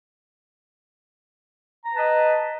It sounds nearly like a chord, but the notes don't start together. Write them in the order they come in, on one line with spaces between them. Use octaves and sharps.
A#5 A5 B4 D#5